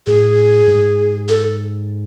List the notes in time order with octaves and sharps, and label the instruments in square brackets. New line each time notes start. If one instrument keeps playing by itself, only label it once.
[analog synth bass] A2 [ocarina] G#4
[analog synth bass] G#2
[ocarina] A4